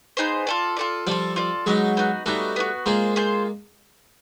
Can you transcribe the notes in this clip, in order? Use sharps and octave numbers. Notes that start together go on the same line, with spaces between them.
B3 D#4 G#4 C5
F4 A4 D5
F4 A4 D5
F3 G3 F4 A4 D5
F4 A4 D5
F#3 G#3 B3 D#4 F#4
B3 D#4 F#4
G3 A3 B3 D#4 F#4
B3 D#4 F#4
G#3 A#3 F4 G#4 C5
F4 G#4 C5